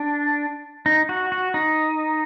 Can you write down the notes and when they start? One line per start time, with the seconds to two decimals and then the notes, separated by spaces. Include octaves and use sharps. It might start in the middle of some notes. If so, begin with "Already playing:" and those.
Already playing: D4
0.86 D#4
1.09 F#4
1.32 F#4
1.54 D#4